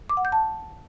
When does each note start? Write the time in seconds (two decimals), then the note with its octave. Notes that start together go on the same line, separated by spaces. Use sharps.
0.10 D6
0.17 F#5
0.25 G6
0.32 A5